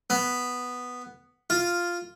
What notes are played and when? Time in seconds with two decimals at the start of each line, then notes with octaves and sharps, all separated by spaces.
0.10 B3
1.50 F4